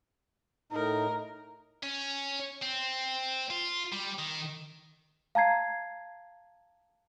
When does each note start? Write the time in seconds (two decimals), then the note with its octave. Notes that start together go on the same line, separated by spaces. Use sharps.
0.72 A2 D#4 A#4
1.83 C#4
2.62 C4
3.51 F4
3.92 G3
4.19 D#3
5.35 F5 A5 A#5 G#6 C7